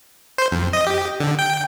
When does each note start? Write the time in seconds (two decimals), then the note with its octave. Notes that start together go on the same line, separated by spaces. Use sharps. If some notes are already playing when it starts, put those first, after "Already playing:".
0.38 C5
0.52 F2
0.73 D#5
0.87 G4
1.20 D3
1.39 G5